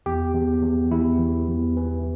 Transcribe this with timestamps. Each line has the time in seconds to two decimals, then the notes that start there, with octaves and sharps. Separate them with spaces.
0.06 E2 G4
0.34 E2
0.62 E2
0.91 E2 E4
1.19 E3
1.48 E2
1.76 E3